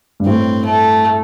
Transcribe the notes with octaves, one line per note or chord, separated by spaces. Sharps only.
G2
A2 C4
A3